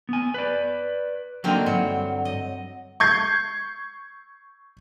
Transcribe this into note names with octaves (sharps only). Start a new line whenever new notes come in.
B3 G#5
B4 D5
D3 F#3 A#3 C4 D#4 E5
G2 F#3
D#5
C#6 G6 G#6 C7